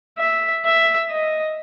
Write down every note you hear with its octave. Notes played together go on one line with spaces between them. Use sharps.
E5
E5
D#5